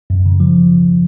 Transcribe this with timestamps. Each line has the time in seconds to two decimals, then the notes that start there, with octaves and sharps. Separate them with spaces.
0.10 F#2
0.26 C#3
0.40 F3